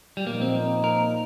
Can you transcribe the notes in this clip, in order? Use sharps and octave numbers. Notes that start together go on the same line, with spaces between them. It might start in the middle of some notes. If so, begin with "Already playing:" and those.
G3
A#2 F3 A#3 D#4
C4
A#4